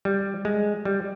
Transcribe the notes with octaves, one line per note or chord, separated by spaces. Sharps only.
G3
G#3
G3